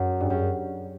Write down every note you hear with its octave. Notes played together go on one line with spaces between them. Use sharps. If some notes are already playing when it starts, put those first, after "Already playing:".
Already playing: F#2
G2
F#2